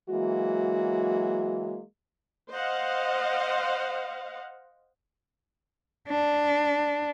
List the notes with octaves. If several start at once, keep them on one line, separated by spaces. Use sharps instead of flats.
E3 F#3 G#3 A#3 F#4
C5 D#5 F5 F#5
D4